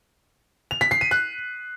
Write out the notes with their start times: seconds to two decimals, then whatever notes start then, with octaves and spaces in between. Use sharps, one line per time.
0.71 F7
0.81 B6
0.91 C7
1.01 D#7
1.11 F#6